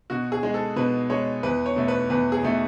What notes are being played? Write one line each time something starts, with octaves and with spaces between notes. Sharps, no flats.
B2 F#4
G#4
G#3
A4
B2 B4
G#3 C#5
E2 B4
C#5
B2 A3
B4
E2 B4
G#4
B2 A3